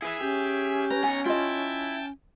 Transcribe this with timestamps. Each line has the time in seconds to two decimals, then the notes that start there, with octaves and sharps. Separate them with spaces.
0.02 E4 G#4 B4 E5
0.21 C#4 G4
0.91 B4 A#5 A#6
1.03 B3 C#5 G#5
1.26 E4 F4 D#5 G5 A5